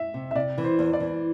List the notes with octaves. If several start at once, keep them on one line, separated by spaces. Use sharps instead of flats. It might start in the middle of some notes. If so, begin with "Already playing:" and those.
Already playing: E5
C3
E5
C3 D5
E3
C5
E2
D5
E3